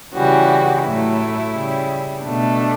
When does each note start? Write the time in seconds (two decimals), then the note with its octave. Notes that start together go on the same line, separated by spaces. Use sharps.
0.14 C#3 E3 G3 F#4
0.84 A2 F#3 A3 E4
1.54 C#3 G3
2.24 B2 A3 D4